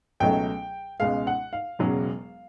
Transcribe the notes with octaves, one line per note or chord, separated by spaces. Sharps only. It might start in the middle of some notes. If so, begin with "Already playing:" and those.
C#2 B2 F#3 A3 G5
C#2 B2 G#3 F5
F#5
F5
E1 E2 C#3 F#3